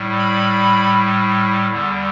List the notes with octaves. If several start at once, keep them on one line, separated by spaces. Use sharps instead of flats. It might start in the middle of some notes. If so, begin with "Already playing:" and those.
Already playing: A2 G3
B5
E2 D3 G3